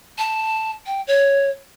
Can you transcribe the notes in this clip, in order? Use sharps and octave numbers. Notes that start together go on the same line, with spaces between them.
A5
G5
C#5